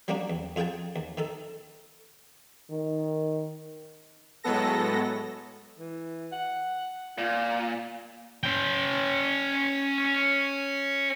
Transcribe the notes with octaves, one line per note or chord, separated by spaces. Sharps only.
F#3 G3 A#3 C#4 D4 F#4
E2
F2 F4 G#4 F#5 G5 A5
D#2
D#3 D#4 A4
D#3
A2 F#3 G#3 B3 A4 A#6
E3
F#5
A#2 F4
C#4 G5